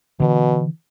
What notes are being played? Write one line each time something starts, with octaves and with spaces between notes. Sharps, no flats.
B2 D3 E3